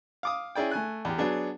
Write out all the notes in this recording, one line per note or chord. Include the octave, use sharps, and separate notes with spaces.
F5 D6 D#6
C#4 E4 G#4 D5 G5
A3 G#5 F#6
E2 G4
F#3 B3 D4 G#4